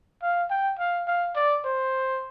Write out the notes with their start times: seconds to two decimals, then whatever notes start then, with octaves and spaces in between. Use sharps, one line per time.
0.22 F5
0.50 G5
0.79 F5
1.07 F5
1.35 D5
1.64 C5